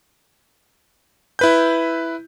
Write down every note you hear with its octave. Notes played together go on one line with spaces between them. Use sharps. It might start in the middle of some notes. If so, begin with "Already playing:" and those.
E4 B4 G6